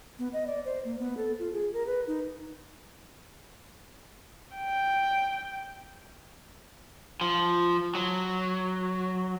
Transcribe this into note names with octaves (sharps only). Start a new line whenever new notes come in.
B3
D#5
D5
C5
A#3
B3
A4
F4
G#4
A#4
B4
D#4
G5
F3
F#3